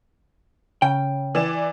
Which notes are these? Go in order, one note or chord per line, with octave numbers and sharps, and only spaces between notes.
C#3 G5
E3 D5 E7